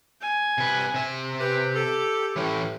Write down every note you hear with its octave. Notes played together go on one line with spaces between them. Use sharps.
G#5
C3 B4
C3 E5
G4 B4
A4
A2 E3 C#4